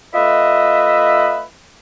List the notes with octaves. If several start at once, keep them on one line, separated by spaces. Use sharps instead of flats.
A3 F4 B4 D#5 E5